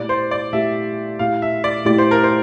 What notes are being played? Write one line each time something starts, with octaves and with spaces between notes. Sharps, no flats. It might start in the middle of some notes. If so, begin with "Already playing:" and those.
Already playing: A#2 A3 E4 G4 D5
C5
D5
A#2 A3 E4 G4 E5
A#2 A3 E4 G4 F5
E5
D5
A#2 A3 E4 G4 D5
C5
A#4
C5